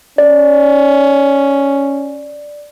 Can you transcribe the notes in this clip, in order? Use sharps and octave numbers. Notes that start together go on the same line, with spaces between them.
C#4 D5